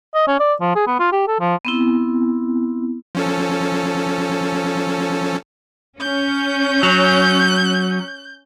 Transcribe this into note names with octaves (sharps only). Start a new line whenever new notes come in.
D#5
C#4
D5
F3
G#4
B3
F4
G4
A4
F3
B3 C4 E4
F3 C#4 A4
C#4 G6
F#3